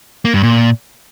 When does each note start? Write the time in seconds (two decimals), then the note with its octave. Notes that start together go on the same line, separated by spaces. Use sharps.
0.25 A#3
0.34 G2
0.43 A#2